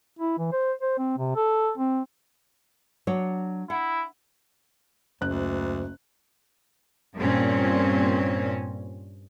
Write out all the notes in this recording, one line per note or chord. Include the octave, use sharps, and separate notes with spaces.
E4
E3
C5
C5
C4
C3
A4
C4
F#3 D4 C#5
E4 F#5
F#1 D2 F#6
G2 A#2 C4 C#4